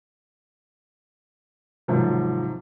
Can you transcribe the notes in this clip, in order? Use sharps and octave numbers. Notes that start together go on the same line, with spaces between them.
G#1 G#2 C3 F3 F#3